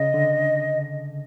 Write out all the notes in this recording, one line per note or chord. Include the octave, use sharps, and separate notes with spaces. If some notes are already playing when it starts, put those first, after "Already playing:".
Already playing: C#3 D#5
D3